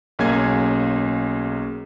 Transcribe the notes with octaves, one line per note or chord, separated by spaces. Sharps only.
B1 A#3 C#4 G#4 G#5 G#6